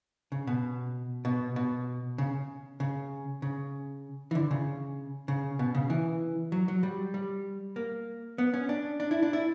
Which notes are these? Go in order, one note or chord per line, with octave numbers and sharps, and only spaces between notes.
C#3
B2
B2
B2
C#3
C#3
C#3
E3
D3
C#3
C#3
B2
C#3
E3
F#3
F#3
G3
G3
A#3
B3
C#4
D4
D4
E4
D4
E4